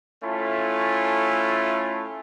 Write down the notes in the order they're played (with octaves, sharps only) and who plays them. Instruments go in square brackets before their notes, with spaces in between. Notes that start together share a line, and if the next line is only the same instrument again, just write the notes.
[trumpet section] A3 C#4 E4 F4 A4